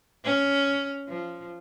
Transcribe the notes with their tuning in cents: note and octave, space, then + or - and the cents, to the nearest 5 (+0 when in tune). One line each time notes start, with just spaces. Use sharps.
C#4 +10
F3 -10